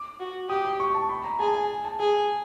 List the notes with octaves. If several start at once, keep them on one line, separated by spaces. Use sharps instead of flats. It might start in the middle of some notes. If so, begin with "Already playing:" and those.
Already playing: D6
F#4
G4 D#6
D6
C#6
A5
B5
A#5
G#4 A5
G#5
A5
G#4 A5